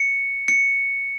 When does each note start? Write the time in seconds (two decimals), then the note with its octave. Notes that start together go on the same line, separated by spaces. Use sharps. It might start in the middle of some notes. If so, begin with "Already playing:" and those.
Already playing: C#7
0.48 C#7